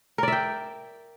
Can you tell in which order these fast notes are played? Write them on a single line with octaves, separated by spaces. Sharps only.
A#4 D5 E5 G5